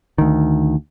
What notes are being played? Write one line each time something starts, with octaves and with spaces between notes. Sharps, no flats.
D2 D#3